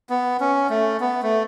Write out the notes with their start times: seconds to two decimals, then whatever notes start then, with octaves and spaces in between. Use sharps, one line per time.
0.10 B3
0.40 C#4
0.70 A3
1.00 B3
1.23 A3